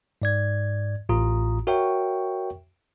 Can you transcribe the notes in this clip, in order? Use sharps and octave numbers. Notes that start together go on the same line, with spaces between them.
G#2 D5 G#6
A1 A2 F4 A#5 D#6
F#4 A#4 C#5 E5 G5 C#6